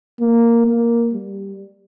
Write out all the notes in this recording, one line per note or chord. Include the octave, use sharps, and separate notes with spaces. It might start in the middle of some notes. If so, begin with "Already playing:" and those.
A#3
A#3
G3